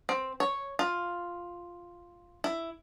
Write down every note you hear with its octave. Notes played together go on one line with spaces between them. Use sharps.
C4
C#5
F4
E4